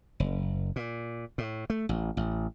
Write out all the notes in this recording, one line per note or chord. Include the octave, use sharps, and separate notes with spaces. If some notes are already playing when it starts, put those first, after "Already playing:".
F#1
A#2
A2
A3
A1
A1